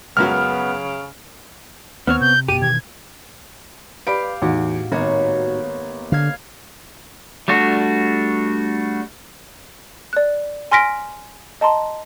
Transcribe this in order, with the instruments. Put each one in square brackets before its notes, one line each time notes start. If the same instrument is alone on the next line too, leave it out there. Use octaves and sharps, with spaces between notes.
[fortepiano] C#2 F#2 F#3 [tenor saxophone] C#3 [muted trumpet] B3 [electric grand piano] F6
[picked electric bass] D#2 [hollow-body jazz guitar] B3 C4 C#5 [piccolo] F6
[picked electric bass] C3 [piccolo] G6
[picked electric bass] F#1 B2 [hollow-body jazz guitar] G4 [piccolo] D#7
[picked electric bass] B2 D#3 E3 [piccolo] G#6
[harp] G4 F5 [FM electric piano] B4 D5 [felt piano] B5 D7
[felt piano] E2 [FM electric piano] A2 D#4 F#4
[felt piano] G#1 [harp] A#3 B3 C#5
[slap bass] D3 [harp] F5 F6 G#6
[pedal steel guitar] G3 A3 D4 F#4
[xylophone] D5 F#6
G#5 C6 F6 A#6 B6 D7
D#5 A5 A#5 C6